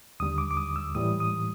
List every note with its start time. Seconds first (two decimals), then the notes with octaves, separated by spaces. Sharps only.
0.20 D#2 D3 G3 D#6
0.38 D6
0.51 D6
0.57 D#6
0.76 E6
0.95 A2 E3 G3 D#6
1.20 D#6